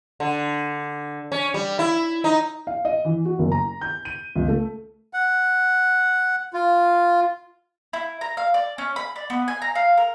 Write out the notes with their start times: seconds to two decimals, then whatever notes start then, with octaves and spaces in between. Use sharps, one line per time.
0.20 D3
1.32 C#4
1.54 G3
1.79 E4
2.24 D#4
2.67 F5
2.85 D#5
3.05 E3
3.25 F#4
3.39 F#1
3.52 A#5
3.81 G6
4.05 D#7
4.36 C#2
4.48 A3
5.13 F#5
6.53 F4
7.93 E4
8.21 A#5
8.37 F5
8.54 D5
8.78 C#4
8.96 B5
9.16 D5
9.30 B3
9.48 G#5
9.62 A#5
9.75 F5
9.98 A#4